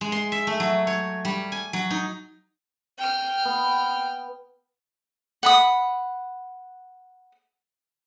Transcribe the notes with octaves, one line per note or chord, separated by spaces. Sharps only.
G#3
C6
E5
A3
F#3
C#5
G3
G#5
F#3
D#4
G5 F6
B3
F#5 B5 D#6